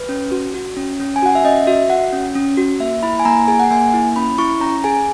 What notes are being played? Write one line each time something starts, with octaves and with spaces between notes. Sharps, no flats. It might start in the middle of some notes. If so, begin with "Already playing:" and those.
Already playing: B4
C#4
F#4
F#4
C#4
C#4
G#5
F#4 F#5
E5
C#4 D#5
F#4 E5
F#4 F#5
C#4
C#4
F#4
A#3 E5
E4 B5
G#5
A#3 A#5
G#4 G#5
F#5
A#3 G#5
E4
C#4 B5
E4 C#6
C#4 A#5
G#4 G#5